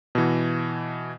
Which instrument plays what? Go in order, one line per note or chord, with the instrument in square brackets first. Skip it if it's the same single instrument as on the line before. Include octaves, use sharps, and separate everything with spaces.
[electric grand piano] B2 E3